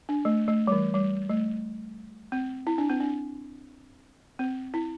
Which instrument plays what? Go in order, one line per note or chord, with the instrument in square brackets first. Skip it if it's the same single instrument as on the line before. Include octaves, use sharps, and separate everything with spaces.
[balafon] D4
A3
A3
G3
E3
G3
A3
C4
E4
D4
C4
D4
C4
E4